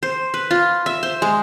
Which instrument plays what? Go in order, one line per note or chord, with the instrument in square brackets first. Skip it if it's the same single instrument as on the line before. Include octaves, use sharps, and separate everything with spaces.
[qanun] C5
B4
F4
E5
C5
G#3